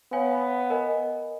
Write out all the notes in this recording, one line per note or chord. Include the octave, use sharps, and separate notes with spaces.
B3 C#5 F5 G#5
A#4 D#5 G#5